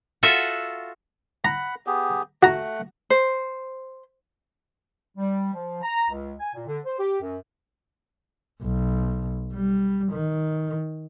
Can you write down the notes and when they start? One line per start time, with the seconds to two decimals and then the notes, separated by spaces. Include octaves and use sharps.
0.23 F4 F#4 A4 E5
1.45 F#5 A#5 B5
1.87 B3 G4 G#4
2.43 A3 F#4 F#5 A#5
3.10 C5
5.17 G3
5.53 F3
5.82 A#5
6.10 C#2
6.40 G#5
6.55 A#2
6.67 D3
6.85 C5
6.99 G4
7.21 F#2
8.63 B1
9.54 G3
10.12 D#3